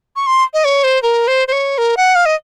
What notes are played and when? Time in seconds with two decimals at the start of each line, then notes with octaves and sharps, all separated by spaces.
0.16 C#6
0.27 C6
0.54 D#5
0.65 C#5
0.84 C5
1.02 A#4
1.27 C5
1.48 C5
1.52 C#5
1.78 A#4
1.97 F#5
2.15 F5
2.26 D#5